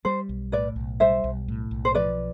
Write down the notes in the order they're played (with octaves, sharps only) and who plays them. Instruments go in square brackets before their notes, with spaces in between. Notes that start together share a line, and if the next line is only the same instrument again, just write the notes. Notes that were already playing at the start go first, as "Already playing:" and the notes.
[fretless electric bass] G3 [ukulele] C5
[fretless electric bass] B1
[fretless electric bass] A2 [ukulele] B4 D5
[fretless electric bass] B1
[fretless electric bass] G3 [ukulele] C5 E5
[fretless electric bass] B1
A2
B1
[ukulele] C5
[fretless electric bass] F3 [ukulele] B4 D5